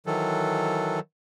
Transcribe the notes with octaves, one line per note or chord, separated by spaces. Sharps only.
D#3 E3 F#3 A4